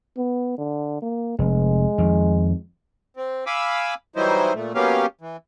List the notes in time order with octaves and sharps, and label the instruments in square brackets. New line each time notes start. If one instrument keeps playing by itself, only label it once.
[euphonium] B3
D3
A#3
[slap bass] F1 [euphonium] G#3
[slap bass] F2 D#3
[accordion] C4
F5 G#5 B5 D6 E6
E3 F#3 G3 D#4 E4 C5
A#2 A3
F#3 A#3 B3 C#4 G4 F5
E3